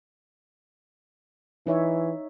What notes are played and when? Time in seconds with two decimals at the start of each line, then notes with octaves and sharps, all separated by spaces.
1.67 E3 D#4 C#5 E5